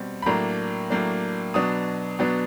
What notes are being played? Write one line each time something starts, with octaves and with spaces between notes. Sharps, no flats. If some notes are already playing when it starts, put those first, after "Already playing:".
Already playing: B2 G3 C4
B5
A2 F#3 A#3 D4 A#5
A2 F#3 A#3 D4
B2 F#3 B3 D4 D#6
B2 F#3 B3 D4